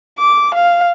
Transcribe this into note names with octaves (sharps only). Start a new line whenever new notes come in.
D6
F5